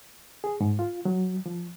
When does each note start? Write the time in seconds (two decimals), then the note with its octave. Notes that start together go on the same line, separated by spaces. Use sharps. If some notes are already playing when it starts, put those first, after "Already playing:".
0.44 G#4
0.61 G#2
0.79 F4
1.05 F#3
1.46 F3